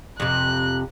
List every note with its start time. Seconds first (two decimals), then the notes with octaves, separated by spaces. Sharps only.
0.20 F2 C3 F#6